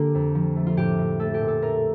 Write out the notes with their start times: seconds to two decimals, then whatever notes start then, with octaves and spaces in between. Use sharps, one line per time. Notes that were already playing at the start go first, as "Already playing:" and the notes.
Already playing: D3 A#3 G4
0.15 F2
0.35 F3
0.56 A3
0.67 F4
0.77 A2 G4
0.99 A2
1.19 A3 A4
1.34 G4
1.41 A#2
1.48 A4
1.62 A3 A#4